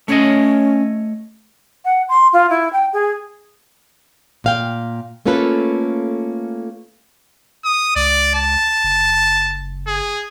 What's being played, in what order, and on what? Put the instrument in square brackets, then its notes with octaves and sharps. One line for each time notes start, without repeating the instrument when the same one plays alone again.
[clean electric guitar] A3 C#5 D#5 [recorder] C#4
[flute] F#5
C6
F4
E4
G5
G#4
[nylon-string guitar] A#2 F5 G5
A3 A#3 C#4 F4 A4 B4
[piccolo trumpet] D#6
[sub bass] C#2 [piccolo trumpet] D5
[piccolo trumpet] A5
[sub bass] F#1
[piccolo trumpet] G#4